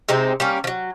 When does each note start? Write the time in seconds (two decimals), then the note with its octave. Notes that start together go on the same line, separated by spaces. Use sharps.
0.09 C3 G#3 C4 D#4
0.40 G3 A#3 C#4
0.64 F3 F#3